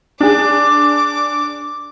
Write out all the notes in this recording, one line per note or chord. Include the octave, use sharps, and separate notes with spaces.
D4 G#4 D6